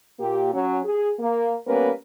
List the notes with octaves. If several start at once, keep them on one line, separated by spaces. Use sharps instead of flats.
A#2 A#3 G4
F#3 C#4
G#4
A#3
G3 A#3 B3 C#4 A#4 B4